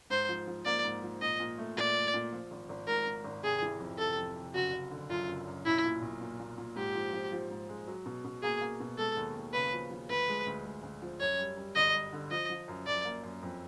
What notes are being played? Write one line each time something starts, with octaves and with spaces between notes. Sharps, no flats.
G#2 C5
F3
F3
A#3 D5
G#2
F3
A#2 D#5
A#2
A3
A#2 D5
A3
A#2
F3
G#1
G#1
G#2 A#4
G#2
G#1
C3 G#4
E3
F2
C3 A4
F2
C3
F#1 F#4
F#1
D3
F#2 F4
F#1
F#2
B1 E4
A#2
B1
A#2
A#2
A#2
G#2 G4
F3
F3
F3
G#2
G#3
F#3
B2
B2
A#3 G#4
A#3
B2
G#3 A4
D#2
D#2
C#3 B4
F3
F3
D2 B4
G#3
D2
G#3
D2
F3
F#2 C#5
G3
G3
G1 D#5
G3
D3
F3 D#5
F3
F#2
F#2 D5
A#3
F#2
F2